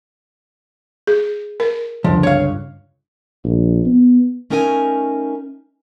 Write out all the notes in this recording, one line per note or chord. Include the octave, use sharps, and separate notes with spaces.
G#4
A#4
C#2 G2 D3 F3
C#5 F5
A#1
B3
A3 C#4 D#4 A#4 G5 G#5